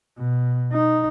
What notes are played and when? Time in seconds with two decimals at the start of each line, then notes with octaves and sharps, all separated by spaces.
0.18 B2
0.73 D#4